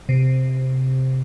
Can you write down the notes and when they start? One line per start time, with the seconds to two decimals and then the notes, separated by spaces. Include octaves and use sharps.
0.09 C3